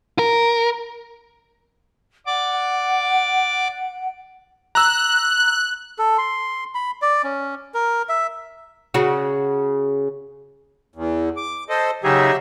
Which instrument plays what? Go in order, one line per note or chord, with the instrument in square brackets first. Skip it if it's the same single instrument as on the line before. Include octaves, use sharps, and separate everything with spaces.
[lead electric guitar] A#4
[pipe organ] D5 D6 [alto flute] F#5
[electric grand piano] A#5 E6 [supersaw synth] F#6
[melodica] A4
C6
B5
D5
C#4
A#4
E5
[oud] C#3 F#4
[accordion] E2
D6
A4 C5 D#5
[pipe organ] C#3 D#4 G#4 [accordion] F#3 G4 E5